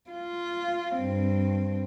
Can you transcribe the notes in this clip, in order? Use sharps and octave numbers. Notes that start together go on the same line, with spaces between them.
F4
G2 C4